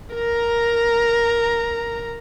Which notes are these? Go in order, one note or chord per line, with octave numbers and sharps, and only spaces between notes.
A#4 A#5